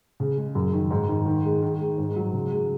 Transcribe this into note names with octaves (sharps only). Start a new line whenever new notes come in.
C#3
G#3
F#2
D#3
G#2
D#3
D#3
G#3
D#3
G#3
G#2
F#3
C#3
G#3